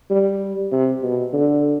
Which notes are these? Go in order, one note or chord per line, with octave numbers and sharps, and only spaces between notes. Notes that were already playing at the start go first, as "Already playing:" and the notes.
G3
C3
B2
D3